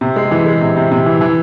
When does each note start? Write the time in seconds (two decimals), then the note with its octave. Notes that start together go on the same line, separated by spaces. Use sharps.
0.01 C3
0.16 G#3
0.31 E3
0.46 G#3
0.61 C3
0.77 C3
0.91 C3
1.06 E3
1.21 E3